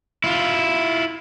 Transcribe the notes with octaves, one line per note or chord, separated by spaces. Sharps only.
E4 F4